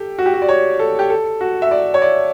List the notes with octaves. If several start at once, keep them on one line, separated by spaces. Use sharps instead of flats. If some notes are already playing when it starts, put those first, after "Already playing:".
Already playing: G4 A4
F#4
G4
F#4
D5
C#5
A4
G4
A4
F#4
E5
D5
C#5
D5